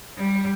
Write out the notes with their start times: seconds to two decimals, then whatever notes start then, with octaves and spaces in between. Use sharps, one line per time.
0.17 G3